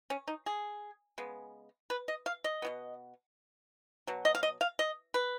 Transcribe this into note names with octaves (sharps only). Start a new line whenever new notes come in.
C#4
D#4
G#4
C#3 G#3 B3
B4
D#5
F5
D#5
B2 F#3 B3
B2 F#3
D#5
F5
D#5
F5
D#5
B4